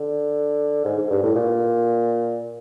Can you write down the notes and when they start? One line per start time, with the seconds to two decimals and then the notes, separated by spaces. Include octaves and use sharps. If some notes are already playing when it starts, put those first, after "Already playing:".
Already playing: D3
0.85 G#2
0.98 G#2
1.10 G2
1.23 A2
1.35 A#2